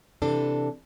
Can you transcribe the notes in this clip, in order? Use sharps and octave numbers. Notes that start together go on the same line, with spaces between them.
C3 E3 D4 A4